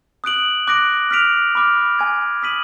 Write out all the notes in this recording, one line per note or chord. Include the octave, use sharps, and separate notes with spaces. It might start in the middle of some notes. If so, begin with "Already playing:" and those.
D#6 F#6 D7 F#7
D6 F#6 A#6 D7
F6 B6 D7 F7
B5 D6 F6
G#5 D6 G#6
D#6 G#6 B6 D#7 F#7